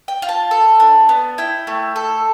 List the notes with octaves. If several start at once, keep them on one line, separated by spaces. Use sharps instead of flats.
G5
F4
A5
A4
D4
B3
E4 G5
A3
A4